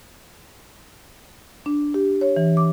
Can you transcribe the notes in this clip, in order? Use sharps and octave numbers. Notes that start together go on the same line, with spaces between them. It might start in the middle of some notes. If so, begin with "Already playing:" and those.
D4
G4
C#5
E3
D6